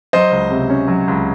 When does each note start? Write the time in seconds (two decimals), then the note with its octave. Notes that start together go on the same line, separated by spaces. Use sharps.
0.13 F#3 C5 D#5
0.31 C#2
0.50 C3
0.70 C#4
0.88 F#3
1.08 C#2